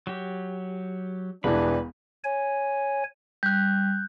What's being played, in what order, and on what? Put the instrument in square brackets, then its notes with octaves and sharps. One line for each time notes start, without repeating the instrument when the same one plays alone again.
[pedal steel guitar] F#3 G4
[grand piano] E1 E3 [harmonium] G3 D4 [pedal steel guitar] B4 B5
[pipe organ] C#5 G#5
[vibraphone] G3 [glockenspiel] F#6 G6